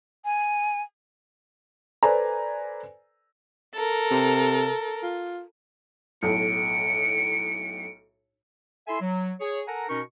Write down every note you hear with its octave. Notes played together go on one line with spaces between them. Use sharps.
G#5
A4 B4 C5 D5 G#5 A#5
A4 A#4
C3
F4
B1 A2 C#7 D7
E4 A4 E5 G#5 C6
F#3
G#4 C#5
A4 A#4 F#5 G#5 A#5
B2 C#4 D#4 A#4 C#6